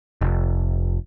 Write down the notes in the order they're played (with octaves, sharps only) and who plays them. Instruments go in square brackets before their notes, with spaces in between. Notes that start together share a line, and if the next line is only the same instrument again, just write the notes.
[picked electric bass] F1